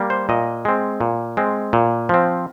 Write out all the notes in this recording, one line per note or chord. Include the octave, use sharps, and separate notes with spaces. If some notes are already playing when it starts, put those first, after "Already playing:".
Already playing: G3 A#3
C5
A#2 D#5
G#3 C4
A#2
G#3 C4
A#2
F3 C4